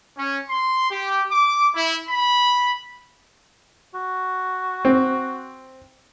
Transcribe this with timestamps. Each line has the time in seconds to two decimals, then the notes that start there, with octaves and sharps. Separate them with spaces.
0.18 C#4
0.50 C6
0.91 G4
1.31 D6
1.75 E4
2.09 B5
3.94 F#4
4.85 C4